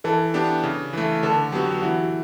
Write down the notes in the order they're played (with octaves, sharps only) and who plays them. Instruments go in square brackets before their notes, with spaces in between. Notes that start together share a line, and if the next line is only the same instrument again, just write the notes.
[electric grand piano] E3 [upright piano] A4
[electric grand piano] B3 D4 G4
C#3
E3 A3
[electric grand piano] D3 [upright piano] A4
[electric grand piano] F#3 B3 F#4 [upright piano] G4
[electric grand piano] E3 [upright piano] F#4